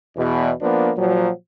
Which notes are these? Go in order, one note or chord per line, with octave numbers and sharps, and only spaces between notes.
E2 B2
F3 A#3 B3 D4
A#2 F3 F#3